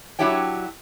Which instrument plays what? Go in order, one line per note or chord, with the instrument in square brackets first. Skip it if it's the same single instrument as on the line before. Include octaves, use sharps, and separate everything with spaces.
[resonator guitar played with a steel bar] F#3 D4 E4 G4 C#5 G5